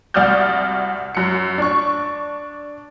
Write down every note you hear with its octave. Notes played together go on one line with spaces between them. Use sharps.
C2 F#4 D5 D#6 F6 G6
F#2 C#7
D4 C#6